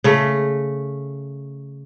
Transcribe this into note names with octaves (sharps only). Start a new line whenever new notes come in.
C#3 A3